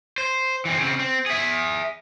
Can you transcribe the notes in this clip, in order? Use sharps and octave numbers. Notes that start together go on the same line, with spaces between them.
C5
E3 C4
C#3 C4
C4
G#4 E5